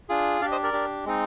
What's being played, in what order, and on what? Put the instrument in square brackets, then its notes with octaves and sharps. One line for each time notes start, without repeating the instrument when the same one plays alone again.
[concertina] D4 F4 G#4
D4 D5 F5
G4
C5 D#5
A#4 D5
D4 G4
G#3 C4 D#4